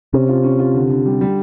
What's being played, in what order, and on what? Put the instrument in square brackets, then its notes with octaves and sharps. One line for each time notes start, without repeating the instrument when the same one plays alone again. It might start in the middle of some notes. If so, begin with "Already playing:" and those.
[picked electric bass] C3 [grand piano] C#4
[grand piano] F4
C#4
F4
D3
D3
G3
G3